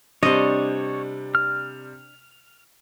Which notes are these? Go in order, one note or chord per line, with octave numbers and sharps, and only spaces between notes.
C3 G3 D4 C5 C#5 D#5
F6